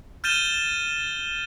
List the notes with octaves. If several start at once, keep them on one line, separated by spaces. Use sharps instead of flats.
F6 G6 A6 D#7 E7 G7